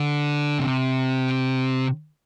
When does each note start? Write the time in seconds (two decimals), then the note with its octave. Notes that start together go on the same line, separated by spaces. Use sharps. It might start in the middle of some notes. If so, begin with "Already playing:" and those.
Already playing: D3
0.59 C3